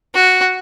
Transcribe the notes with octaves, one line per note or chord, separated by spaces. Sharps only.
F#4